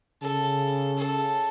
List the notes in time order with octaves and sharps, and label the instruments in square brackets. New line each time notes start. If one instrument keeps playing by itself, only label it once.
[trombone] C#3 [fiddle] A4
[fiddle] A4